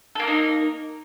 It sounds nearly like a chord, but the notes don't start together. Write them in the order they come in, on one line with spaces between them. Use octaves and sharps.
A4 A#3 A#4 D#4